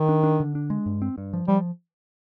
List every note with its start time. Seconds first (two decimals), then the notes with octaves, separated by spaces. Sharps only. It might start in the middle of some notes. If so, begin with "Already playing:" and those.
Already playing: D#3
0.09 D4
0.23 D4
0.40 D3
0.55 D4
0.70 G#3
0.86 G2
1.02 C4
1.18 G2
1.33 F3
1.48 F3 G3